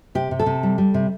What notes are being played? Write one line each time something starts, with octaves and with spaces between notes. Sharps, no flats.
C3 G4
C3
A4
C3
G3
G3
C3